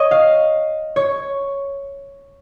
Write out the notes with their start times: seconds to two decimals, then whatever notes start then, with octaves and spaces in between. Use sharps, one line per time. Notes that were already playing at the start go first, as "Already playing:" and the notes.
Already playing: C#5 D#5
0.11 F5
0.96 C#5